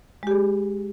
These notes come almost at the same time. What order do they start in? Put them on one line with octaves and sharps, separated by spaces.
G#3 G4 G#4